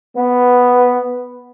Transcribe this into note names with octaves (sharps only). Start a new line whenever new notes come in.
B3